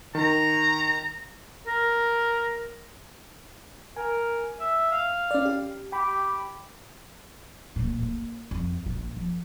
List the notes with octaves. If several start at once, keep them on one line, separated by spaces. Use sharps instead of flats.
D#3 A#5
A#4
A#4 G#5
E5
F5
C#4 D5
G4
G4 G5 B5
A#2 F#3
A#3
F2
A#1 F4
F3